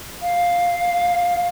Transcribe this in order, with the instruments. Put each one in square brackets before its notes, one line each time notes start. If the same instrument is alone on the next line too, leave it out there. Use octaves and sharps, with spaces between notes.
[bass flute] F5